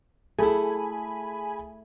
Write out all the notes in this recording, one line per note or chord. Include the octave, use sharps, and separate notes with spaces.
A3 E4 G#4 G#5 B5